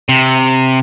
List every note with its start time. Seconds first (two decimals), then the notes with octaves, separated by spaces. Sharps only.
0.09 C3